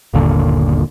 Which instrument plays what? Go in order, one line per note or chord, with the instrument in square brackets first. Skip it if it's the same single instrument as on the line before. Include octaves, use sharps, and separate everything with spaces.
[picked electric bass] G1 D#2 A#2 D3